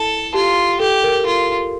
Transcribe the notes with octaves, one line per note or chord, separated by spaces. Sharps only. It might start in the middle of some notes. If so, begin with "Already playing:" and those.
Already playing: E4 A4
F4 G4
G4 A4
A#4
F4